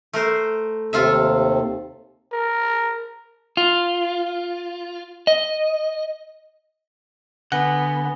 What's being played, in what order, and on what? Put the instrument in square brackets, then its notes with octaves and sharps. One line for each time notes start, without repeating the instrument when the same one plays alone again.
[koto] A3 A#4 C5
[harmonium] D#2 C3 [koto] F4 A4 E5
[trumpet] A#4
[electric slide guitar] F4
D#5
[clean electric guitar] D3 [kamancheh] B3 [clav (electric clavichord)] F#5 [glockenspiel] G#5 A#6 G7